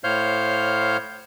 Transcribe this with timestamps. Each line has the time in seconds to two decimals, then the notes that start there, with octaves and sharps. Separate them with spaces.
0.04 A2 C5 C#5 F5 F6 G6